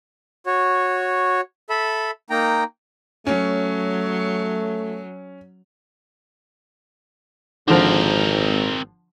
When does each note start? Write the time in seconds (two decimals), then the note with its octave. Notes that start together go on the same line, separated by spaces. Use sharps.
0.46 F#4 C#5
1.70 A4 E5 B5
2.30 A#3 D#4 G5 A#5
3.27 F#3 A3 C#4
7.68 G#1 D3 F3 C4 A#4